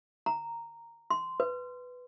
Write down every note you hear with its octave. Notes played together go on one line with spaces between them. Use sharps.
A#5
C6
B4